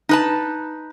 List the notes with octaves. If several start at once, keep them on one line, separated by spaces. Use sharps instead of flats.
D#4 B4 A5